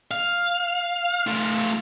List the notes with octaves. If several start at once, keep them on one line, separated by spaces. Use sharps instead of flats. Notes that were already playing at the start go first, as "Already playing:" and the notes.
F5
A3 F4